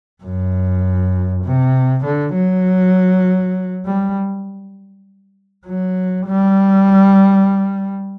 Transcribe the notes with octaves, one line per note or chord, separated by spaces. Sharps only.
F#2
C3
D3
F#3
G3
F#3
G3